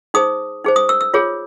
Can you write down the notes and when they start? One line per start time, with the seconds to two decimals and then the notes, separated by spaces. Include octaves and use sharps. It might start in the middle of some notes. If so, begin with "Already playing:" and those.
0.14 D#4 G#4 C5 D#6
0.64 D#4 G#4 C5
0.76 D#6
0.89 E6
1.01 E6
1.14 F4 G#4 C#5